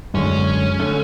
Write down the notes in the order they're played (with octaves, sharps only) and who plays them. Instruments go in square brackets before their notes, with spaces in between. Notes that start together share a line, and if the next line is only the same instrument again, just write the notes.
[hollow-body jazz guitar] F#2 D3 G#3 [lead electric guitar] C#4
[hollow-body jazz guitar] D3 A3